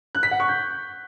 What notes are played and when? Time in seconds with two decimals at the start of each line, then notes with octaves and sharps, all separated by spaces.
0.15 F#6
0.23 B6
0.31 F#5
0.40 C#6
0.48 G6